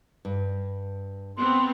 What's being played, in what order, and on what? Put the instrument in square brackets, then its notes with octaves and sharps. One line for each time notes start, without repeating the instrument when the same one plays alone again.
[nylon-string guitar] G2
[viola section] B3 C4 [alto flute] C6